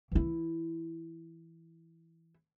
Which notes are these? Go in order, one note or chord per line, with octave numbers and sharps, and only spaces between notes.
E3 E4